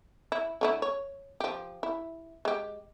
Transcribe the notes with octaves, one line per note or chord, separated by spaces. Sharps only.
E4
D3 A3 E4
C#5
F3 G4
E4
G#3 G4